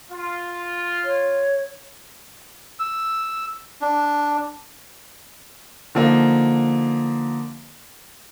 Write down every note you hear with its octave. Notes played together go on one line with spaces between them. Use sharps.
F4
C#5
E6
D4
D3 F3 A#3 D#4